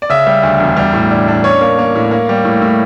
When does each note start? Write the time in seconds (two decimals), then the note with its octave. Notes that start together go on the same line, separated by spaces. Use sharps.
0.02 D5
0.09 C#3 E5
0.27 G3
0.43 D2
0.60 E1
0.77 G3
0.93 A2
1.11 D4
1.28 D4
1.44 C#4 C#5
1.61 A#3
1.79 A#3
1.95 A2
2.11 A#3
2.29 G3
2.45 A2
2.62 A2